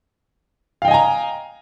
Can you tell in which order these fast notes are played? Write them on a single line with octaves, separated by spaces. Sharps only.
F5 G5 D#5 G#5 A#5